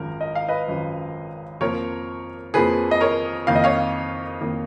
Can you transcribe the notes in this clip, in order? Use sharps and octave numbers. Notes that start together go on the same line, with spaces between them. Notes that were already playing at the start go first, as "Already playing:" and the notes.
Already playing: G#1 F#2 F3 A#4
D#5
F5
B4 D#5
G#1 F#2 F3
F2 F3 A#3 A#4 C#5
F2 F3 A#3 G#4 B4
D#5
A#4 C#5
F2 D#3 A#3 F5
D#5
C#5 F5
F2 D#3 A#3